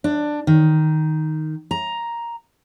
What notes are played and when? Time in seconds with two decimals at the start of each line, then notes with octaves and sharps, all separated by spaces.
0.04 D4
0.47 D#3
1.71 A#5